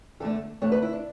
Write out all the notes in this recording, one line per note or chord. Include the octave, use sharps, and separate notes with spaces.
E2 D3 A3 A4
E2 D3 A3 C#5
B4
E4
D4